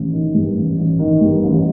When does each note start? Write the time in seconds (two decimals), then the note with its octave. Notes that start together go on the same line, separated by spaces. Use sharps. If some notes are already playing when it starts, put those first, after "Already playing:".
Already playing: A1
0.13 D#3
0.34 G2
0.56 A1
0.78 A1
0.99 D#3
1.21 G2
1.43 A1